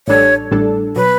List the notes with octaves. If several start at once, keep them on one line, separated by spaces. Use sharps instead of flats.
A1 A2 G3 D4 A4 C#5
A1 A2 G3 D4 A4
B2 F#3 B4